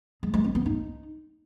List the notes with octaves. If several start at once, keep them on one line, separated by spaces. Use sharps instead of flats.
G#3
G#3
C4
B3
D#4